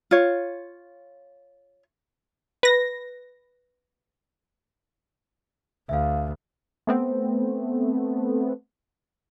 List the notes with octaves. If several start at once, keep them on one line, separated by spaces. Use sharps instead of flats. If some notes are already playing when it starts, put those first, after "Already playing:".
F4 C#5
B4 A#6
D2 E5 F5
A3 B3 C4